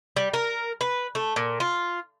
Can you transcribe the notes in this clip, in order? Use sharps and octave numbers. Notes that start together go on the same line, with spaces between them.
G3
A#4
B4
A3
A#2
F4